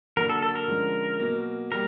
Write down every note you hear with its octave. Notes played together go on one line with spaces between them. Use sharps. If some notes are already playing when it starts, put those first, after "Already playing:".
D3 F#3 A#3 A#4
A4
A4
A#4
D3 F3 G#3 C#4
B2 F#3 A#3
G3 A#3 A#4